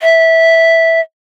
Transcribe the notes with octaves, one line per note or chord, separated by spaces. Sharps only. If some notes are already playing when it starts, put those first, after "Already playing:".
E5